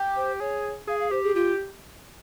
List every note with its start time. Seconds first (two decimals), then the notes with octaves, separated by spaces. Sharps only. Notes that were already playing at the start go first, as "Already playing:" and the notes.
Already playing: G4
0.16 C5
0.40 G#4 C#5
0.87 G#4 F5
0.99 F5
1.11 G4 C5
1.23 G#4
1.35 F4 G4